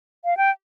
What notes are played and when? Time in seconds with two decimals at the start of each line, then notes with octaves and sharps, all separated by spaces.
0.25 F5
0.37 G5